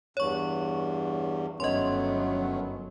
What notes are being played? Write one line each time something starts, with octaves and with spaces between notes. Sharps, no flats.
E2 G2 C#5 C#6
G1 D#3 F#3 A3 B3 C#4 D#5 C6